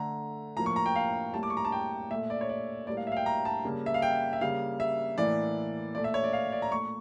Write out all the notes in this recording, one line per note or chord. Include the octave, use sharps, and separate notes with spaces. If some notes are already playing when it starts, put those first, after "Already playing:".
Already playing: D3 A3 A#5
A2 F3 A#3 A#5
C#6
A#5
G5
F5
A2 G3 A#3 A5
D6
C#6
A#5
A5
G5
A#2 A3 E5
D5
C#5
D5
A2 G3 A#3 D5
F5
E5
F5
G5
A#5
A5
C#3 G3 A#3
E5
F5
G5
E5
C#3 G3 A#3 F5
E5
A2 E3 A#3 D5
A#2 A3 D5
E5
C#5
D5
F5
D5
A#5
A#2 A3 C#6